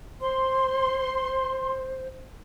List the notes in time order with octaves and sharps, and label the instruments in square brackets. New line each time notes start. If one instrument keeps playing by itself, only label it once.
[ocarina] C5 [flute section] C6